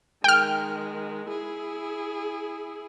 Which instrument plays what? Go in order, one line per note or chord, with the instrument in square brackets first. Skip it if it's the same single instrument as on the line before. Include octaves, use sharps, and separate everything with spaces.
[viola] D#3 G#3 [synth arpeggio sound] G5 F6
[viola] E4 G#4